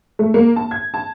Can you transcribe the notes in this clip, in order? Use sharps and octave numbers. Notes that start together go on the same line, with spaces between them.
A3
A#3
A5
G#6
A5